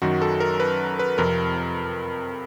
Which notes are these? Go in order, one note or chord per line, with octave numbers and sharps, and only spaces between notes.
F#2 D#3 F#3 F#4
A4
A#4
B4
B4
F2 C3 F3 A#4